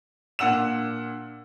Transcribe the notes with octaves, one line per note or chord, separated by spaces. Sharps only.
A#2 D4 F#5 E6 E7